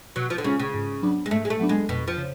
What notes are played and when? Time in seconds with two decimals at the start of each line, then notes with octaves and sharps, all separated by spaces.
0.16 B2 F#3
0.30 F3
0.38 D3
0.44 C#3 G#3 C#4 F4
0.59 C#3
0.74 G#2
1.02 F#3 B3 D4
1.26 G#3
1.31 G#2 A3
1.45 G#3
1.50 A3
1.60 F#3 B3 D4
1.69 G#3
1.89 F2 B2
2.08 F3
2.17 C#3